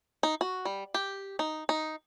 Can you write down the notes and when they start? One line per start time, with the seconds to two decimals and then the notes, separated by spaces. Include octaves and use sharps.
0.23 D#4
0.41 F#4
0.65 G3
0.94 G4
1.39 D#4
1.69 D#4